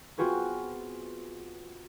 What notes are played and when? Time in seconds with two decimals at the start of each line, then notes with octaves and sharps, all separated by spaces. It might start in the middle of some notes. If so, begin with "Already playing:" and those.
0.18 B3 C4 F4 F#4 G#4 B4